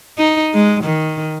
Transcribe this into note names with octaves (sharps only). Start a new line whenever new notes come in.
D#4
G#3
D#3